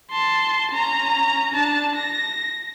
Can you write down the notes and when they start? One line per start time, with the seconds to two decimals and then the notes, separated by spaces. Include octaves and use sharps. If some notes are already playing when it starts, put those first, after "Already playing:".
0.11 A5 C6
0.72 C#4 A#5
1.54 D4 A5
1.95 A#6